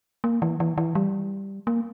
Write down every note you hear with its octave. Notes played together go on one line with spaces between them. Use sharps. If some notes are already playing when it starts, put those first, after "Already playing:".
A#3
E3
E3
E3
G3
A#3